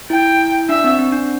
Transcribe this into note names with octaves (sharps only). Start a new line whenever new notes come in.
E4 G5
D4 E5
C4
C4
D4